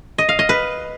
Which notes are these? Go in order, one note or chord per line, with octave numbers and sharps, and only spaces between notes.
D#5
F5
D#5
B4